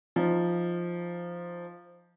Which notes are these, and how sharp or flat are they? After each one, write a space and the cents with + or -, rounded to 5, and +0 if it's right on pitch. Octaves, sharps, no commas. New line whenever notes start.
F3 -5 D#4 +0